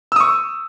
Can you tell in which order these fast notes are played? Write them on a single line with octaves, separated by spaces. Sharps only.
E6 D#6 C#6